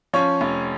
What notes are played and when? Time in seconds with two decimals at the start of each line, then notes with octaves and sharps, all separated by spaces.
0.13 F3 C#4 C#5
0.41 F1